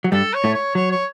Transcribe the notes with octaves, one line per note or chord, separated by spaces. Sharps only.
F#3
G2 G3 A4
C#5
A2 A3
C#5
F#3 C#5
C#5